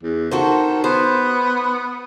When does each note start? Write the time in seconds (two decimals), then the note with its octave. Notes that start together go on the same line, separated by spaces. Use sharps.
0.03 E2
0.31 D#3 F#4 A4 C5
0.84 B3 C5